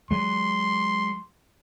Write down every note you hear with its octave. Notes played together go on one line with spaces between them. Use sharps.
F#3 G#3 C6